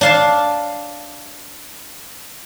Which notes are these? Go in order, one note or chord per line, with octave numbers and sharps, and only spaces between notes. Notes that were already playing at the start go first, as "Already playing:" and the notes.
D4 F5 A5